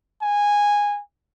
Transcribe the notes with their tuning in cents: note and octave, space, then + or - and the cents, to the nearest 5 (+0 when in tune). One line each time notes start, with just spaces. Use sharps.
G#5 -10